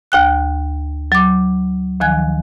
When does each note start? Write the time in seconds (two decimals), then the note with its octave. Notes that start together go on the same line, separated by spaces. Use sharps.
0.12 D2 G5 F#6
1.12 F#3 D6
2.01 D2 D#3 F3 G#5 F#6 G#6